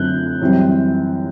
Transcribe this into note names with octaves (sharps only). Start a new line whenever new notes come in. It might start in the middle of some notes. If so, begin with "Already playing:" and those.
Already playing: F#2 D3 A3 C4 F#6 G6
F#2 E3 G3 C4